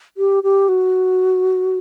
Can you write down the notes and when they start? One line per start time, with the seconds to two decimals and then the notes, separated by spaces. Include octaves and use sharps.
0.17 G4
0.43 G4
0.69 F#4